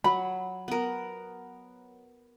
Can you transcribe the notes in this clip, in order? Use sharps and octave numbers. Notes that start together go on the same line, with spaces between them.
F#3 B5
B3 A#4